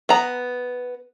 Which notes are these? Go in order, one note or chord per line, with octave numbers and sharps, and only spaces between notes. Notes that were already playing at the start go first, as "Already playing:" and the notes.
B3 A#5